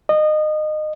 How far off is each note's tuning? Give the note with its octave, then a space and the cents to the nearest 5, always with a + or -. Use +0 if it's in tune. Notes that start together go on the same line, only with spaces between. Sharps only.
D#5 -25